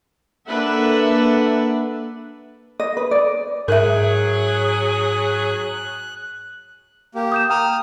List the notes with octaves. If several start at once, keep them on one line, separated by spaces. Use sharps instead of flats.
A#3 D4 A4 B4 E5 F#5
D#5
B4
D5
G#2 F#3 G#4 A#4 E5 F#6
A#3 G4
D#6 G6 E7
G5 A#5 D#6 F6